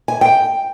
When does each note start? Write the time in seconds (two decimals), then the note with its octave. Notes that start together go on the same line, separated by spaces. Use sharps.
0.08 G#5
0.21 G5